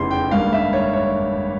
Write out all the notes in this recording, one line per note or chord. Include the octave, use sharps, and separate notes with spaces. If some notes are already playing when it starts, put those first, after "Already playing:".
Already playing: F1 E2 C#3 E3 C6
G5
G#1 G2 G3 A#3 F5
E5
C#5
C#5